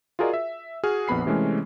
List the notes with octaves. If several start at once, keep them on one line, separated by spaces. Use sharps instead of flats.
F4 F#4 G#4 A#4 D5 D#5
E5
F#4 G#4 F6
A#1 F2 B3 B5 C7
C3 E3 G#3 A3 C#4